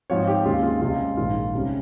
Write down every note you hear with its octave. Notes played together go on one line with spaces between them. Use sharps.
G#2 F3 C4 C#5
G4
D#2 C#3 G#3 C4 F4
F4
C#2 C3 G3 C#4 F4
A#1 G#2 D#3 G#3 F4
C#2 C3 G3 C#4